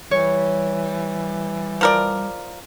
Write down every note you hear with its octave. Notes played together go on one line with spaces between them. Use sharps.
E3 G3 C#5
F3 A#4 D5